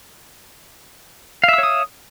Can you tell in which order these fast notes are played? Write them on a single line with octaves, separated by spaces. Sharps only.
F5 E5 E6 C#5 D#6